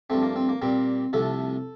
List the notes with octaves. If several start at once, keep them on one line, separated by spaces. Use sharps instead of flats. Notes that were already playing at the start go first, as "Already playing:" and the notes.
G2 F3 A3 C4
A#3
C4
A#3
A#2 G3 A#3 C4
C2 C3 F3 A3 A4